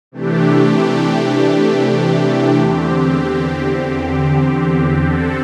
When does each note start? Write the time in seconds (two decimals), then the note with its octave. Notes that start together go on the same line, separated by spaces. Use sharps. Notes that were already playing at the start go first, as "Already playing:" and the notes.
0.12 C3 E3 A3 D4 G4
2.57 E2 D3 C4 G4
5.04 D3 C4 A4